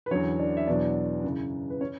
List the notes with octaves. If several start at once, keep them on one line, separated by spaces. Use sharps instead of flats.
B4
E2 D3 F#3 C#4 C#5
D4 D5
E5
E2 B2 F#3 D4 D5
F#2 C#3 E3
B4
C#4 C#5